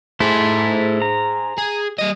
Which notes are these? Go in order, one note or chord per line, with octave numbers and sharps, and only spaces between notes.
A3 E4 G#4 C5
A#5
G#4
G3 D#5